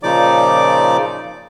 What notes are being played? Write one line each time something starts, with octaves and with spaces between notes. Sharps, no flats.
A#2 C#3 F3 D#4 D5 D6